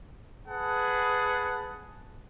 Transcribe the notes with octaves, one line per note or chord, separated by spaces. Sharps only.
G#4 B4 F#5 A5